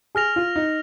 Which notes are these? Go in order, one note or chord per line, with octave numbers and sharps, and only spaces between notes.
G#4 F6 A#6 F7
F4
D#4